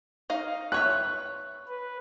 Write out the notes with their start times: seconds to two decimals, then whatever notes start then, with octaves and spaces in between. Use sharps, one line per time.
0.30 D#4 D#5 F5
0.72 B4 C#5 E5 F#6
1.68 B4